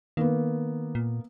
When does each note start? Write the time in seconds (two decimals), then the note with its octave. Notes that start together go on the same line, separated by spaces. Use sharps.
0.17 D#3 A#3 B3
0.95 A#2